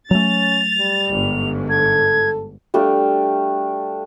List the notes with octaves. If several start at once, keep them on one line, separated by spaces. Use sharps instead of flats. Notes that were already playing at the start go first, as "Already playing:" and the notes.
F#3 A3 C#4 A6 F7
G3
G1 G#2
A4 G#6
G3 A3 D4 F5